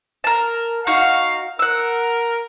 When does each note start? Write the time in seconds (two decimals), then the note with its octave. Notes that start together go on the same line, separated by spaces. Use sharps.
0.24 A#4 A5
0.87 D#4 F#4 F5
1.59 A#4 F#5 E6